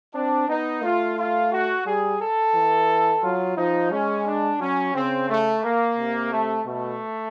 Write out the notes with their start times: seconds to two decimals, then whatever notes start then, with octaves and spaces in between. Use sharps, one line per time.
0.14 C4 D4
0.48 B3 D#4
0.83 A3 F4
1.17 F4
1.51 F#4
1.86 G3 G#4
2.21 A4
2.54 E3
3.22 F#3 F4
3.57 F3 D#4
3.91 G#3 C#4
4.26 D4
4.60 F#3 C#4
4.94 C#3 C4
5.28 A3
5.63 A#3
5.98 C3
6.31 A3
6.65 B2 A3